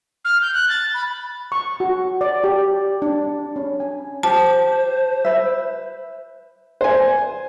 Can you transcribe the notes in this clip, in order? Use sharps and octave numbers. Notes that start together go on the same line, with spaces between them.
F6
G6
F#6
A6
B5
C#6
F#4
D5
G4
D4
C#4
G#5
G4 C5 A5
B4 E5
C5 G#5